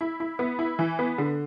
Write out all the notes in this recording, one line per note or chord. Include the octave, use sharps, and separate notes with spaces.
E4
E4
B3
E4
E3
B3
D3